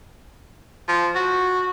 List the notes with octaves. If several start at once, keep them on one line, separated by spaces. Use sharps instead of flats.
F3
F#4